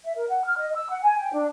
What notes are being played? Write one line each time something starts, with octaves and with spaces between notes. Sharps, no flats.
E5
A#4
F#5
F6
D#5
E6
F#5
G#5
G5
D4